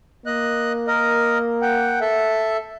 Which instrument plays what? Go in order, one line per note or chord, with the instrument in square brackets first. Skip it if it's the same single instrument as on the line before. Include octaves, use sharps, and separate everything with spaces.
[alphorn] A#3 [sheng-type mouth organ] D#5 F#6
[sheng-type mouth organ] A#4 D#5
F#5 G5
A4 E5